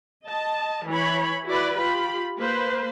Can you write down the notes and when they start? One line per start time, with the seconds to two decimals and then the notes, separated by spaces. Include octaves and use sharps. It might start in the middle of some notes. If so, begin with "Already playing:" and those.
0.24 D#5 A5
0.89 E3 C#5 B5
1.49 E4 F#4 B4 D5
1.80 F4 G4 B5
2.40 A#3 B4 C5